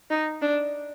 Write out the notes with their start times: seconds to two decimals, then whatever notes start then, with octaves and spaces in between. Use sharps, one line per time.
0.10 D#4
0.42 D4